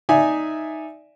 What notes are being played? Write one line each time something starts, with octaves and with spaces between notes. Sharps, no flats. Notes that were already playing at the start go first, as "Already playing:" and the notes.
D#4 D5 E5 G#5